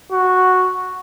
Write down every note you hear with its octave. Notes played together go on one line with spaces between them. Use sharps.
F#4